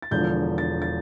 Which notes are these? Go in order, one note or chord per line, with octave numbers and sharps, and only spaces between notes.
A6
E1 E2 D3 F3 G6
A6
A6